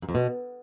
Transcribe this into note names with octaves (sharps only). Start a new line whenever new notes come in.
F#2
F2
B2